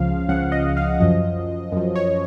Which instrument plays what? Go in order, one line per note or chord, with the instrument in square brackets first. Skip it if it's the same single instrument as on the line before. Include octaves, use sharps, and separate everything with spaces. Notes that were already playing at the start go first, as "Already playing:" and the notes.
Already playing: [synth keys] C#2 C#3 F3 F5
C#2 C#3 F3 F#5
D#5
F5
F#2 F3 D#5
F#2 F3
C#5